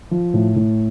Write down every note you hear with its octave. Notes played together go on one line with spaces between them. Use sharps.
F3
A2
A2